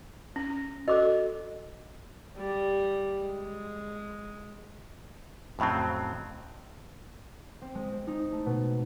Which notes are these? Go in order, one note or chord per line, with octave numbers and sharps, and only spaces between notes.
C#4
F#4 A4 D#5 D6
G3
G#3
F2 A2 C#3 F#3 C4
C4
G#3
C4
D#4
A3
B2